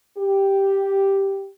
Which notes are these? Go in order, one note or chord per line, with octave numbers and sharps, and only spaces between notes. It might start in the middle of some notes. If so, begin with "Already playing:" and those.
G4